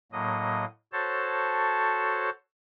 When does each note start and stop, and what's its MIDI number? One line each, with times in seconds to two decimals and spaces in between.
0.12 0.65 45
0.12 0.65 54
0.12 0.65 58
0.12 0.65 75
0.92 2.30 66
0.92 2.30 69
0.92 2.30 72
0.92 2.30 73
0.92 2.30 81